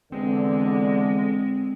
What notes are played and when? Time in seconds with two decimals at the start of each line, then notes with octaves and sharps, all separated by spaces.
0.12 E2 D3 G#3 C4